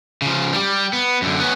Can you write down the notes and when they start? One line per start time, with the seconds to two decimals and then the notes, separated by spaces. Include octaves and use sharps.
0.22 C#3 F3
0.53 G3 G4
0.93 B3
1.22 F#2 D3
1.39 B3 C#4